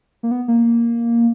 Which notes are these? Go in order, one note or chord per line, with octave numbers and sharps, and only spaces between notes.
A#3
B3
A#3